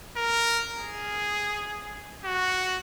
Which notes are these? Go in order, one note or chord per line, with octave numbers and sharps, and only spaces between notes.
A#4
G#4
F#4